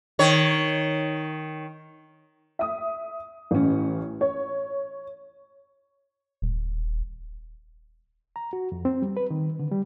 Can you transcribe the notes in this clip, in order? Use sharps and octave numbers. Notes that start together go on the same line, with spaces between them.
D#3 C#5
E5 D#6
A1 C#4
C#5
D#1
A#5
F#4
F2
C4
G3
B4
D#3
D3
G3